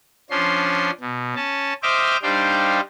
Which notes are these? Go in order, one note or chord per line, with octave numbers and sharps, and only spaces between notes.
F3 C#4 D4 C6
B2
C#4 A5
C5 D#5 E5 G5 D6 F6
G3 D4 D#4 C5 F5 G5